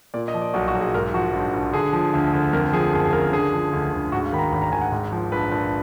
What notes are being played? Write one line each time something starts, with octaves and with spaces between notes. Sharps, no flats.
A#2 D5
D#5
F3
D5
B1 F#4
F#4
B1
G#4
G#2 A#4
F3 F#4
A#1
A#1
D3 G#4
F3
D2
D2
F2 A#4
F3 G#4
F#1 G#4
G#4
F#1 A#4
D3 G#4
F3
D2
D2
G#2 F#4
F5
D#3 B5
A#5
G#1 B5
A#5
G#1 G#5
F#5
G#2
F3
A#1 B4
A#1